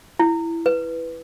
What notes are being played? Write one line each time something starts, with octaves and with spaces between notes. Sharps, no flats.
E4
B4